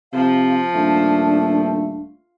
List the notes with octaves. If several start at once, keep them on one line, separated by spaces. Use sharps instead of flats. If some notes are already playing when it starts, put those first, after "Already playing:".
C3 F3 F5
D#1 A3 D4